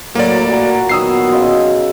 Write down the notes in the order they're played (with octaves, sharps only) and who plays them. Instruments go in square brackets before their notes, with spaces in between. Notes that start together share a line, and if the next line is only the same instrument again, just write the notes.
[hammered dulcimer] A2 [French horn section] F#3 [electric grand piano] A#3 D5
[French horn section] A#2 F#4 [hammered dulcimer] F#5 G#5 A#5
[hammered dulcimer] D#3 F#3 B3 [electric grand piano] D#6 E6 C7
[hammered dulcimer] C#3 D#5 C6